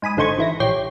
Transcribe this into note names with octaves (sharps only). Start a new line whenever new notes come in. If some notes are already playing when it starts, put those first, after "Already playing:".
G#2 G#5 B5 D#6
G#1 D3 D#4 C5 C#6 G#6
E3 E4 A#6
A#1 G4 C#5 G6 C7